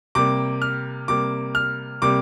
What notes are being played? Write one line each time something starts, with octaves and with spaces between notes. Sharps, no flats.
C3 G3 A#3 D6
F6
C3 G3 A#3 D6
F6
C3 G3 A#3 D6